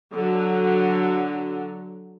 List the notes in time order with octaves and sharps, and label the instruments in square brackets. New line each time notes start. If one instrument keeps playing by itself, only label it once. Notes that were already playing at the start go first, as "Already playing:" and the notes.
[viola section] D3 F#3